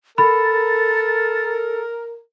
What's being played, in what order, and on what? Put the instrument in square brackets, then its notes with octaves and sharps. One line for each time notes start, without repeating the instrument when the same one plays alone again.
[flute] A4 [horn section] A#4 [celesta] B5 [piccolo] A6